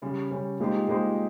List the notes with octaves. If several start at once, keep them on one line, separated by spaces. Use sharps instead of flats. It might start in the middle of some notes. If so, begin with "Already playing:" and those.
C#3 G3 C#4
C#3 G3 C#4
A#2 G#3 D#4 G4 C5
A#2 G#3 D#4 G4 C5